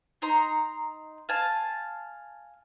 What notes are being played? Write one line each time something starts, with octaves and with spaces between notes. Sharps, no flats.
D#4 A#5 C6
F5 G#5 A5